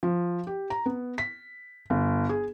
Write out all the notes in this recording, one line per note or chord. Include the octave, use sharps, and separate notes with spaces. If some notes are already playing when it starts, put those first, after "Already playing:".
F3
G4
A#5
B3
B6
G1
G#4